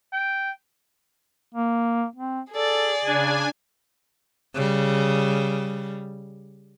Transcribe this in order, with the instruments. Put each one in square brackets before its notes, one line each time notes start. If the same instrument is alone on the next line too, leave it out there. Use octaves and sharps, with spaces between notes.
[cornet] G5
[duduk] A#3
C4
[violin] G#4 D5 [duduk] A4
[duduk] C#3 [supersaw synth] D4 G#5
[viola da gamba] C#3 G3